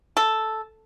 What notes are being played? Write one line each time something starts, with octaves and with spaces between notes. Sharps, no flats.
A4